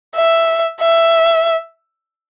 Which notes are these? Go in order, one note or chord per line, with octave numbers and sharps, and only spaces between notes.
E5
E5